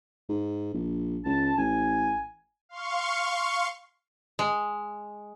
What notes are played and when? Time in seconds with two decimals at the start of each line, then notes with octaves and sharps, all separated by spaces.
0.29 G#2
0.74 A#1
1.26 C#2 A5
1.57 A1 G#5
2.69 F5 C6 C#6
4.39 G#3